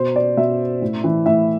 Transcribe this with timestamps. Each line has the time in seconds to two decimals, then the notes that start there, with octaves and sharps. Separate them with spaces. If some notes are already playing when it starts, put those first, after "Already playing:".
Already playing: B2 C5
0.16 D5
0.37 B2 E5
0.82 A2
1.04 E3
1.26 A2 E5